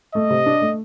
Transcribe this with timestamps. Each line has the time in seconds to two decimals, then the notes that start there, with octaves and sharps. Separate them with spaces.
0.14 A3 D#5
0.30 C3
0.46 D4
0.62 A3